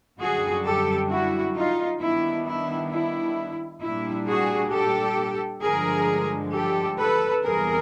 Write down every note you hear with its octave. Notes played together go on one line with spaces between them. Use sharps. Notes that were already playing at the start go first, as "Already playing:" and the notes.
F#2 D3 G3 F#4 G#4
G4 A4
E4 F#4
D#4 F4
D#3 G3 B3 D4 E4
E4
E4
A#2 G3 A#3 D4 E4
F#4 G#4
G4 A4
G2 D3 F3 G#3 G#4 A#4
G4 A4
A4 B4
E2 C3 E3 G3 B3 G#4 A#4